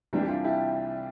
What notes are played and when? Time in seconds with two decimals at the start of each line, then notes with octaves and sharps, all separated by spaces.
0.13 C2 C3 E3 G3 D4
0.22 G4
0.28 D4 F4
0.44 E4 G4